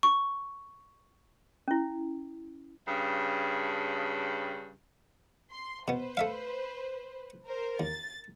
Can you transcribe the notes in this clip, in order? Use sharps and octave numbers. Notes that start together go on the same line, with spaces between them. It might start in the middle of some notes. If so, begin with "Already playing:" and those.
C#6
C#4 E4
G2 C#3
C6
B2 B3 B4 C5
A3 E5 F5
A#4 C5
D#2 A6